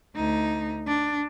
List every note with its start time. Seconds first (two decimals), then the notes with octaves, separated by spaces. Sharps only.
0.16 D2 D#4
0.87 D4